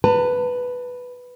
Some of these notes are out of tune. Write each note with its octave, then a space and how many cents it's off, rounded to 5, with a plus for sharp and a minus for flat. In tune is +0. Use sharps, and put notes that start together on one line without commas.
B4 +0 A5 +45